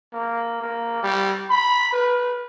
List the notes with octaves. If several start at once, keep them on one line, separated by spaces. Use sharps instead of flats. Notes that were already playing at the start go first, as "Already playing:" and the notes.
A#3
A#3
G3
B5
B4